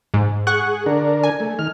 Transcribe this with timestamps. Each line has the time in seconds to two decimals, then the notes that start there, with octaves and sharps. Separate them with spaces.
0.14 G#2
0.47 G#4 F#5 C#6 F#6
0.86 D3 D4 A#4
1.24 G#5
1.40 A3
1.59 D#3 F6